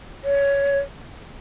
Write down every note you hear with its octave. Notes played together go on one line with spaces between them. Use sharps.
C#5